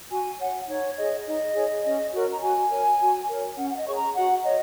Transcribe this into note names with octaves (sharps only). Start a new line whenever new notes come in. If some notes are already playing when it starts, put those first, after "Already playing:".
F#4 G#5
C#5 F#5
D#4 C#5
G#4 C#5 D#5
D#4 D#5
G#4 C#5
C#4
F#4 A#4 C#5
A#5
F#4 G#5
A#4 C#5
F#4
A#4 C#5
C#4 F#5
F#5
D#5
G#4 C#5 C#6
A#5
F#4 F#5
C#5 D#5